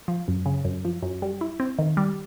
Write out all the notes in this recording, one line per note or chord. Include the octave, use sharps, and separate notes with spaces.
F3
F#2
C#3
F#2
F3
F#2
G3
E4
C4
D#3
G3